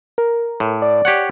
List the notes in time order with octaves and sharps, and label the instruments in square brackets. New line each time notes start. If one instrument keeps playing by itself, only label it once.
[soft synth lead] A#4
[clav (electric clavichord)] A2
[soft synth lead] D5
[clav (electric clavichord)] G4 C#5 F#5